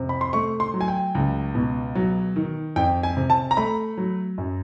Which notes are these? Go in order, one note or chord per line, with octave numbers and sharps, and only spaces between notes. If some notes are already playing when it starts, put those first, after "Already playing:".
Already playing: F2 C3
B5
C6
A3 C#6
C6
F#3
G#5
G5
C#2
B2
F#3
D#3
F2 G5
G#5
C3
A5
A#5
A3 B5
F#3
F#2